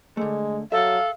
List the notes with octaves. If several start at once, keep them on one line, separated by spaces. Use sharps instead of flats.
D3 G#3 A3
F#3 A4 E5 F5